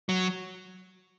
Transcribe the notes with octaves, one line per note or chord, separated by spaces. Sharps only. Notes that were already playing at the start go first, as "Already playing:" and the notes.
F#3